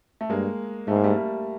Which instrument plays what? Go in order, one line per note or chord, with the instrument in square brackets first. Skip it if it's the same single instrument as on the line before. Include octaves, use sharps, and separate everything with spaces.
[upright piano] A3
[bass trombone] G2 [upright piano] G#3 A#3
[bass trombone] G#2 [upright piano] A3
[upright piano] A#3
G3 A3
A#3
G3 A3